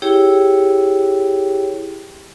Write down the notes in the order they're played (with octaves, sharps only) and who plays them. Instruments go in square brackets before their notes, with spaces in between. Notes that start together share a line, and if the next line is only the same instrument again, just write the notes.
[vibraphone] E4 G4 G#4 C#5 G5